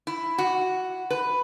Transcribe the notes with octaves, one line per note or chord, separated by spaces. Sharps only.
E4
F#4
B4